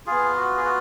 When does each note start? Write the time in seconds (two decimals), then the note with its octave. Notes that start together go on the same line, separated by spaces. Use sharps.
0.07 B3 F4 G#4
0.36 F#4
0.57 G#4
0.65 F#4